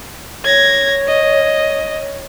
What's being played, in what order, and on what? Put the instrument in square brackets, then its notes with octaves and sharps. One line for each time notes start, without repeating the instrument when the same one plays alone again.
[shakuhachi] C#5 [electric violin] G#6 A#6
[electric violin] D#5